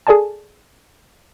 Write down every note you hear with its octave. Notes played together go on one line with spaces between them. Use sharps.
G#4 A4 D5 G#5 A5